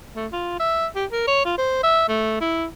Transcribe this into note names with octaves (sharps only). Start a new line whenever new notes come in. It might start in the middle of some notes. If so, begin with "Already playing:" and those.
A3
F4
E5
G4
A#4
C#5
F4
C5
E5
A3
E4